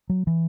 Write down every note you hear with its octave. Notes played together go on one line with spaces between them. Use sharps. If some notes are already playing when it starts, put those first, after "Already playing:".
F#3
E3